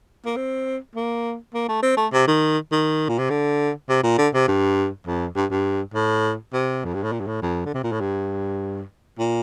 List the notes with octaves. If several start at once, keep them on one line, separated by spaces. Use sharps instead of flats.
A#3
C4
A#3
A#3
A3
C4
A3
C3
D#3
D#3
A#2
C3
D3
C3
A#2
D3
C3
G2
F2
G2
G2
A2
C3
F2
G2
A2
A#2
G2
A2
F2
D3
C3
A#2
A2
G2
A#2